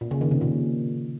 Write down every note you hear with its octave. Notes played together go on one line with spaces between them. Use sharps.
A#2
C#3
D#3
C3
A#2